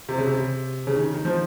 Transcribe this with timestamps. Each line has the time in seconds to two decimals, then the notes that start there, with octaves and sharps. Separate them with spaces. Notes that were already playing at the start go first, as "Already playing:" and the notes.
0.09 C3
0.18 C#3
0.27 C3
0.87 C#3
0.96 D#3
1.14 D#3
1.25 F3